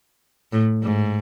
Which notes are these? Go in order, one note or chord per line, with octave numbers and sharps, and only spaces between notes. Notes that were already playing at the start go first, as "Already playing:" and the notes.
A2
G#2